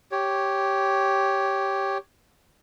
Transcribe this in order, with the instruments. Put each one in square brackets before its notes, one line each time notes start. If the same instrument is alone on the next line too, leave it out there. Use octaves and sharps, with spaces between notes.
[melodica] G4 C#5